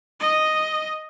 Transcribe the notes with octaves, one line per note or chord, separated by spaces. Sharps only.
D#5